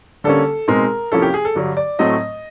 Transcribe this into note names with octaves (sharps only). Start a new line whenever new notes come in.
D3 G3 A#3 C#4 A4
B2 G#3 C4 D#4 A#4
C3 F3 A#3 C#4 E4 A4
G4
G#4
A4
G2 D3 F#3
D5
A2 F#3 A3 C4 D#5